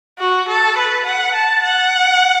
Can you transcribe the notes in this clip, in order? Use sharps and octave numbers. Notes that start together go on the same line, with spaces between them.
F#4
A4
B4
F#5
A5
F#5